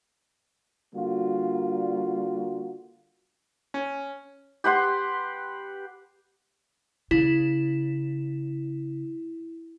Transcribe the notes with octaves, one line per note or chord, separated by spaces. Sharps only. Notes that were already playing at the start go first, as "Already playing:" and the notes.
D3 G3 A#3 F4 F#4
C#4
G4 B4 F#5 C6
C#3 E4